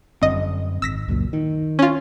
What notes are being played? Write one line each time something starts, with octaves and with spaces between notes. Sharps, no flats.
G1 F#2 D3 C4 D#5
G#1 E6 A#6 B6
C#2 F#2 A#2
D#3
C#4 F4